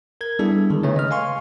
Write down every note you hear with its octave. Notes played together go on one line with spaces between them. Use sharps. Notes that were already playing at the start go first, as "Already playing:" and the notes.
A#4 G#6
G3 B3 D4 E4 G#4 A4
D3 D#3 G#3
C#3 A3 C#4 B4 C#5
D#5 F6
F5 G#5 C6 C#6